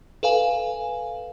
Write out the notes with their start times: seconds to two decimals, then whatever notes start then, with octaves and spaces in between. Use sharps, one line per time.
0.23 A4 B4 F5 G#5